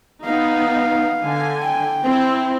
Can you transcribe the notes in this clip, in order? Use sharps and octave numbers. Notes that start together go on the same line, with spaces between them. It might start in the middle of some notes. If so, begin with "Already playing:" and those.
B3 D#4 F5
D3 G#5
G5
C4 E4